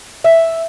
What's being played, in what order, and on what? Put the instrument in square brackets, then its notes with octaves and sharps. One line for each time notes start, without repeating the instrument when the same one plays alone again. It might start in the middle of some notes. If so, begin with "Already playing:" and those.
[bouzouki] E5